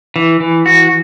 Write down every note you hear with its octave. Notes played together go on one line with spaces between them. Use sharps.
E3
E3
F#4